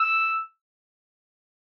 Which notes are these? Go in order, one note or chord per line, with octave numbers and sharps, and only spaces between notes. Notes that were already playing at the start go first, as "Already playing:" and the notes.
Already playing: E6